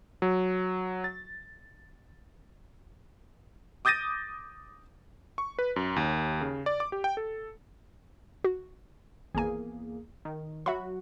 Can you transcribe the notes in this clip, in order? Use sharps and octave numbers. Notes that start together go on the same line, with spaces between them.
F#3
A6
D6 D#6 G6 A6 A#6 D#7
C#6
B4
F#2
D#2
C#3
D5
D6
G4
G5
A4
F#4
G#1 E2 A#3 G#4 G#5
D#3
F#3 F#4 E5 B5